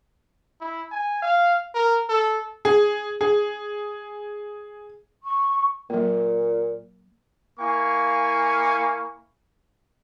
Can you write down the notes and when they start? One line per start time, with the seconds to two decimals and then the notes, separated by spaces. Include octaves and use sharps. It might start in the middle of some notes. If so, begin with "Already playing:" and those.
0.61 E4
0.92 G#5
1.22 F5
1.75 A#4
2.09 A4
2.65 G#4
3.21 G#4
5.23 C#6
5.90 A#2 F#3 A#3
7.59 A#3 E4 F5 G#5 C#6